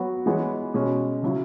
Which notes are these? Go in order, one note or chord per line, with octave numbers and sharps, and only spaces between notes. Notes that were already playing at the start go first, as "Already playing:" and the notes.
Already playing: F#3 B3 F#4
E3 G#3 B3 G#4 C#5
B2 G#3 C#4
C#3 F#3 E4